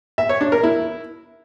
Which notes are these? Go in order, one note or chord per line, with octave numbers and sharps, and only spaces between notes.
E5
C#5
D4
A#4
E4